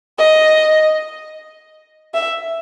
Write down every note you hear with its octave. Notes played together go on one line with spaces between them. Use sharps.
D#5
E5